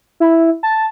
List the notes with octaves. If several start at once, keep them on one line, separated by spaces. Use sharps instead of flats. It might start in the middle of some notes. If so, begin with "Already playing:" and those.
E4
A5